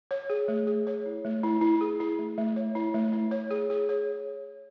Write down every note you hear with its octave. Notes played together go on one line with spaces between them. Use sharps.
C#5
G#4
A3
G#4
C#5
E4
A3
E4
E4
G#4
E4
A3
A3
C#5
E4
A3
E4
C#5
G#4
G#4
C#5